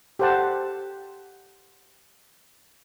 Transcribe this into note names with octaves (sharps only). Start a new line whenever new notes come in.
G4 A4 C5 F#5 A5